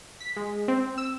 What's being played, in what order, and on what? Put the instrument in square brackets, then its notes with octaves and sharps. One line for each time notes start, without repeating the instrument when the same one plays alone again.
[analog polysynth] B6
G#3
C4
E6